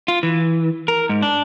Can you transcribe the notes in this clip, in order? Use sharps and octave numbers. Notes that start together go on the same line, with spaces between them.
F4
E3
A#4
G#2
D4